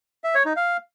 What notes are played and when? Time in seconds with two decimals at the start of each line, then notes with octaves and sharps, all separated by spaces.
0.24 E5
0.35 C#5
0.46 D#4
0.56 F5